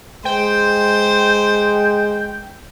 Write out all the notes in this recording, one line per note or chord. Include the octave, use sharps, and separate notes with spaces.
G#3 C5 G5